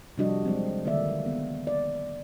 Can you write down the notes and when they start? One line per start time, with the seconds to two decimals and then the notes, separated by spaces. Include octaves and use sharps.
0.18 C3 F3 G3 D4 F#4 D#5
0.46 F#3 G#3 C4
0.85 D3 D#3 A#3 C4 D5 E5
1.26 B3
1.67 D5